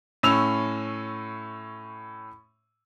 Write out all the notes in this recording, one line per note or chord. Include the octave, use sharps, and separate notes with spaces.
A2 C#4 E6 F7